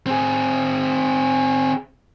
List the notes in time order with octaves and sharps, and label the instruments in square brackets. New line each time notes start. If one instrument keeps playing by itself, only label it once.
[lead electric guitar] C4 G#4